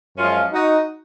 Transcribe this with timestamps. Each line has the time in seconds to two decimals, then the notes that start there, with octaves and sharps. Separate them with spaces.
0.18 F#2 F3 G#3 C#4 F4
0.52 D#4 F#4